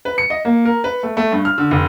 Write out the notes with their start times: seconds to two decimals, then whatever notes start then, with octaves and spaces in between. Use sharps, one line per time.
0.05 B4
0.18 C#7
0.30 D#5
0.45 A#3
0.65 A#4
0.84 B4
1.03 A3
1.17 A3
1.32 G2
1.45 F6
1.58 D3
1.71 F1